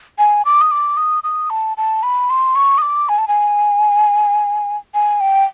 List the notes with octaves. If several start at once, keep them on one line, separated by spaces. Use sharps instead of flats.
G#5
D6
D#6
D6
D#6
D#6
A5
A5
B5
C6
C#6
D#6
D6
G#5
A5
G#5
G#5
G5